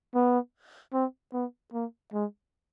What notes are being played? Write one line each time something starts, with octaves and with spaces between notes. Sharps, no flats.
B3
C4
B3
A#3
G#3